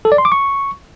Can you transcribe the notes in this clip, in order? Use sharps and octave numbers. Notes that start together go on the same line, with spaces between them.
A4
D5
C6
D6
C#6